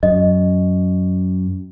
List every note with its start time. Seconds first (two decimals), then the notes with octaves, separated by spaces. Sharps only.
0.03 F#2 D#5